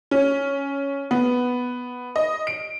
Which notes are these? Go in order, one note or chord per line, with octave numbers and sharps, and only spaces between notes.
C#4
B3
D#5
D7